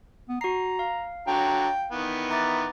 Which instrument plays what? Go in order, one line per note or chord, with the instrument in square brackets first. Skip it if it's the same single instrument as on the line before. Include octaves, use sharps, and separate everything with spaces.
[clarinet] B3
[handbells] F#4 C7 [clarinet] A#5
[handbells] F5
[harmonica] D3 F#3 A#5 [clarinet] G5
[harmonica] D#3 E3 B3
[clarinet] E5 [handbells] A#5 D6 A6